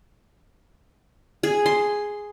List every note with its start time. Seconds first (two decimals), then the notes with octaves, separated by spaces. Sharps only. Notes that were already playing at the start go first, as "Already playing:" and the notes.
1.43 G#4
1.66 C6